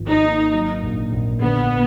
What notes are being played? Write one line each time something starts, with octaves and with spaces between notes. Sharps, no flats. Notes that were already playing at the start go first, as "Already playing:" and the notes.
Already playing: G#1 F3
D#4
A#3
F#3
A#1
A#1
D3 B3